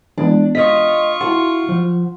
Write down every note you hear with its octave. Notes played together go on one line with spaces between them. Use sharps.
E3 G#3 B3 D4
F4 D#5 C#6 D#6 B6
E4 F#4 F#5 A5 C6
F3